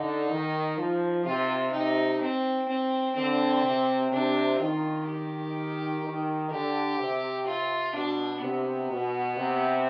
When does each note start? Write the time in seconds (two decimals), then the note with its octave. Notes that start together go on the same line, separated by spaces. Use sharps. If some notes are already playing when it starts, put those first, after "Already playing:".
Already playing: D3 D#4
0.29 D#3
0.77 F3
1.25 C3 F4
1.72 C3 D#4
2.21 C4
2.68 C4
3.16 D3 C4
3.63 C3
4.11 C3 D4
4.59 D#3 F4
5.07 G4
6.03 D#3
6.50 D3 G4
6.99 C3
7.46 F4
7.94 B2 D4
8.42 C3 B3
8.90 B2
9.37 C3